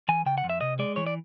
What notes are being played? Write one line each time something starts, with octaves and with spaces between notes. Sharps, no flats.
E3 G#5
C#3 G5
F#5
F2
E5
C3 D#5
G#3 D5
E3 C#5
D5